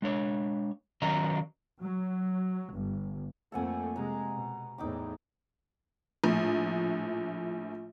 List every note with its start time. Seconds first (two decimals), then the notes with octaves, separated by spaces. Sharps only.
0.02 G#3 D4 C#5
1.02 D#3 F#3 C#4 D#5 F5 A#5
1.84 F#3
2.74 G1
3.52 F2 A3 A#3 A4 F#5 G#5
3.96 C3 G#3 A#5
4.35 B2
4.78 E2 A2 D#4 G5 D6
6.24 A#1 A2